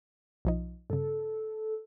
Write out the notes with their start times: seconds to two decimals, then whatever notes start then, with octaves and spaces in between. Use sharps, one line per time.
0.45 B1 F3 D#4
0.90 G2 C#3 A4